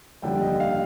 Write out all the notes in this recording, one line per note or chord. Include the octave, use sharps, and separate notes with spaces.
F1 D#2 D3 G3 G5
D#5
F5